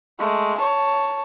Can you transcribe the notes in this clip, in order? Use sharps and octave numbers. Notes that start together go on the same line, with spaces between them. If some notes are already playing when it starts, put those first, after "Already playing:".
G#3 A3
C#5 A5